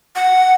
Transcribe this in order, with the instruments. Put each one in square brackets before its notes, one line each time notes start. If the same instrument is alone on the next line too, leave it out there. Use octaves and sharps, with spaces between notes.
[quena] F#5